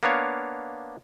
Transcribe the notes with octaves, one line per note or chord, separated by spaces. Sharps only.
A#3 B3 D4 C#5 F5